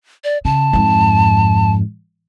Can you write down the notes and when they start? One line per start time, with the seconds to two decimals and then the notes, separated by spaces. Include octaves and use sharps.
0.24 D5
0.45 C#3 A5
0.73 F2 G#2